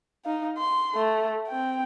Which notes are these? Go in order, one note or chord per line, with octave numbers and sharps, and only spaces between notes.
D#4 F5
C6
A3
C4 G5